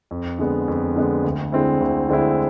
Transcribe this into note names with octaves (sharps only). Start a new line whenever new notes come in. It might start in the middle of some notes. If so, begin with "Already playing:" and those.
F2
D3 G#3 B3
F2
D3 G#3 B3
D2
D3 G#3 C4 E4
D2
D3 G#3 C4 E4